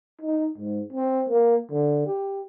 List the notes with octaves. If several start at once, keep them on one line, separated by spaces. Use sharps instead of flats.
D#4
G#2
C4
A#3
D3
G4